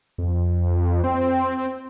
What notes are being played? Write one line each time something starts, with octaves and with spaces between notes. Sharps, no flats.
F2
C4